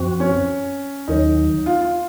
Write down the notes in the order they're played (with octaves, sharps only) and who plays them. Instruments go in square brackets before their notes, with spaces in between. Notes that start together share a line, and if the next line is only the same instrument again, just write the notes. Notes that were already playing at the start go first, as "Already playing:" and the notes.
Already playing: [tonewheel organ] F#2 F3 C4 F#4
[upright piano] C#4
[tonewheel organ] D#2 D#3 F#3 [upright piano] D#4
[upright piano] F4
F4